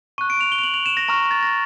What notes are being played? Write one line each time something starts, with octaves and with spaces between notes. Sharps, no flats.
C#6 F#6 D#7
D7
F7
G7
F7
F#7
F7
E7
A#6
A#5 C#6 F6 A#6
A6
A#6